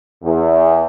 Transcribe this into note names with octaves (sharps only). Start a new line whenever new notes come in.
E2